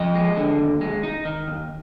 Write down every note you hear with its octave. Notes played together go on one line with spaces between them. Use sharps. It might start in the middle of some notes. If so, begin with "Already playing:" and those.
Already playing: F3 D#5
G#3
D3
D#2
G#3
D#4
D#3
D#2